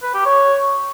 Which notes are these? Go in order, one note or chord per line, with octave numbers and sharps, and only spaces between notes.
B4
G4
C#5